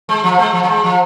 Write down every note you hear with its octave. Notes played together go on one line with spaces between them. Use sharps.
G#3
F3
G#3
F3
F3
G#3
F3